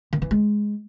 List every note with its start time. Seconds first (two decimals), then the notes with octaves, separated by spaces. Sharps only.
0.13 D#3
0.22 E3
0.31 G#3